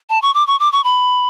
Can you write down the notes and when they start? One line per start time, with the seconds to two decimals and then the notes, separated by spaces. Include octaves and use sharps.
0.10 A5
0.22 C#6
0.34 D6
0.47 C#6
0.60 D6
0.73 C#6
0.84 B5